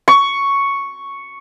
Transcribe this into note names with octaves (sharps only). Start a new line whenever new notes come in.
C#6